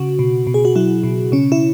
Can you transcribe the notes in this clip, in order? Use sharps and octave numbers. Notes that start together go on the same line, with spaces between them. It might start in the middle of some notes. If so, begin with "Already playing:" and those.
Already playing: C#3 F#4
B2
B2
G#4
F#4
F#3 E4
B2
C#3 C#4
E4